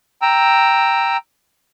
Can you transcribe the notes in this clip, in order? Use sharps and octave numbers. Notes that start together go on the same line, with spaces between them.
G5 A#5 E6